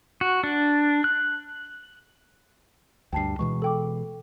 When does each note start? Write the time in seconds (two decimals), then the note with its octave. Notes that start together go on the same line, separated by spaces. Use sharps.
0.21 F#4
0.44 D4
1.04 F#6
3.13 D2 G2 G5 A5 C7
3.39 B2 E3 G#3 C#6
3.62 A4 G5 D6